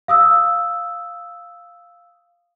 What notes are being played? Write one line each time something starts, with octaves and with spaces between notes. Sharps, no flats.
F5 D#6 E6